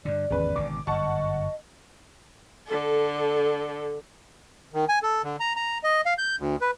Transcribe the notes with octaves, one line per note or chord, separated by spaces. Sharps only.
G2 D3 D5
G#1 E2 C#3 B4
G#1 B2 D3 D6
G1 F#2 D#5 F#5 A5 C#6
D3 A4
D#3
G#5
A4
D3
A#5
A#5
D#5
F5
G6
D2
B4